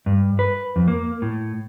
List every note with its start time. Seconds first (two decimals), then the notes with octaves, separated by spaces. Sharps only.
0.06 G2
0.39 B4
0.76 F2
0.88 A#3
1.22 A2